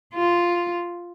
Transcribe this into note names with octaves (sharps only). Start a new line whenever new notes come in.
F4